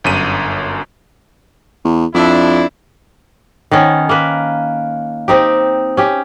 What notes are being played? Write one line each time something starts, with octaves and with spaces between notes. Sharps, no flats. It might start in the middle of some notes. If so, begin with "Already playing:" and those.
G1 F#2 D#7
E2
F2 D4 E4
D#3 B3 C#4
A#3 B4
C4 D#4 G4
C#4 G4